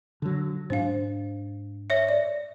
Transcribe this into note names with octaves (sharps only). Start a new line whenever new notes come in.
D3 F#3
G#2 D4 C5 F5
C#5 E5
D5